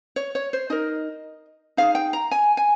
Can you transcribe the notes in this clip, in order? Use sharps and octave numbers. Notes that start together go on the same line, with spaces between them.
C#5
C#5
C5
D#4 A#4 D#5
D#4 G#4 F5
G5
A#5
G#5
G#5